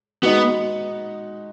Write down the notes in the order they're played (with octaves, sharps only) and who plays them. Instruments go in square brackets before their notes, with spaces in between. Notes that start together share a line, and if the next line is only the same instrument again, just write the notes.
[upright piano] G#3 D#4 F#4 [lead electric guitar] B3